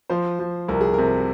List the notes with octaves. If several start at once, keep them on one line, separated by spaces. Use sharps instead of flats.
F3 C5
F3
C2 A#4
G#4
A#4
C3